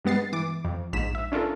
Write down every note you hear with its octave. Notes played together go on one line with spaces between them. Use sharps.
G2 G#3 B3 A6 C7
E3 D6
F2
A#1 G#2 B6 E7
E5
C#4 D4 F4 A4 A#4